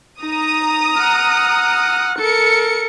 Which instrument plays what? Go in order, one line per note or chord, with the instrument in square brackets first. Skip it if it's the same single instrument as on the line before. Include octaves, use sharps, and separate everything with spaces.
[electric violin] D#4 [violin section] A#5 D#6
[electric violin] F#5 F6
[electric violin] A4 A#4 [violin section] C#7